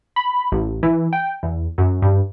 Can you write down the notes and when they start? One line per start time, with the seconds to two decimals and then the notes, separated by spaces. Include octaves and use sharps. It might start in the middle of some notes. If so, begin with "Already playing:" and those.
0.16 B5
0.52 A1
0.83 E3
1.13 G5
1.43 E2
1.78 F#2
2.02 G2